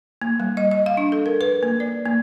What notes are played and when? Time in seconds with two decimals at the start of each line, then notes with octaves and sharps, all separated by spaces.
0.22 A#3
0.40 G3
0.57 D#5
0.71 D#5
0.86 F5
0.97 D4
1.12 A4
1.26 A#4
1.41 B4
1.63 A#3
1.80 D5
2.06 A#3